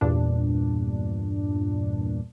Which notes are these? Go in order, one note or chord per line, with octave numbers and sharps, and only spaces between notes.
E2 G2 A#2 D4